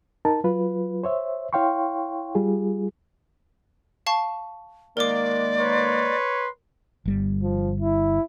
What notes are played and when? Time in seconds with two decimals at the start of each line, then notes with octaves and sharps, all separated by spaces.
0.25 D#4 A#4 A5
0.44 F#3 F4 B4
1.04 C5 C#5 E5
1.53 E4 C#5 F5 G5 C6 C#6
2.35 G3 F4 G#4
4.06 F5 A5 C#6
4.97 D#3 G#3 A#3 A#4 D5 D6
5.59 B4 C#5 C6
7.06 G1 G3
7.43 F3
7.81 E4